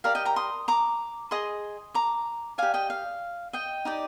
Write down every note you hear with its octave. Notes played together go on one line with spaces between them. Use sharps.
G4 A#4 D5 F5
D#5 G5
G5 A#5
C6 D#6
A#5 D6
G#4 D#5 C6 D#6
A#5 D6
G4 D5 F5 G#5
D#5 G5
F5
D#5 G5
D#4 G4 D5